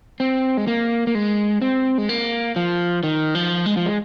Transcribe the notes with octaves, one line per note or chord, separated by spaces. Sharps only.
C4
G#3
A#3
A#3
G#3
C4
G#3
A#3
F3
D#3
F3
G#3
F3
G#3